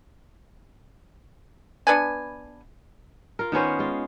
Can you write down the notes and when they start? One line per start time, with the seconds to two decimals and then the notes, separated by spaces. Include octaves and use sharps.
1.87 B3 D4 B4 G#5
3.39 F4 A#4
3.52 D#3 B3 C#4 C5
3.79 G#3 F4